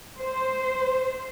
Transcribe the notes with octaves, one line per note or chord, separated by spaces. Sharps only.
C5